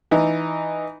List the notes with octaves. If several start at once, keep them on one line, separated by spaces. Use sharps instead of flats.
E3 D#4